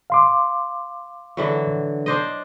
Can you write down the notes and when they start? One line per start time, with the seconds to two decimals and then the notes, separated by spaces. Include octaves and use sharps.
0.10 F5 C6 D6
1.37 D3 E3 F#3
2.06 D4 C5 D#5